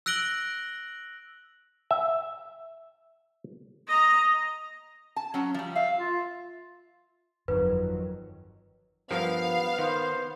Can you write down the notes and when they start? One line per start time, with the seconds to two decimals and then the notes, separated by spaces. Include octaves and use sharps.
0.06 E6 F#6 A#6 D7 F#7 G7
1.91 E5
3.88 D#5 A#5
5.16 A5
5.34 F#3 C#4
5.54 F3 G3
5.76 E5 F5
5.98 F4
7.48 G1 F2 D#3 F#3 B4
9.11 G2 F3 B3 A#4 F5
9.78 D#3 C5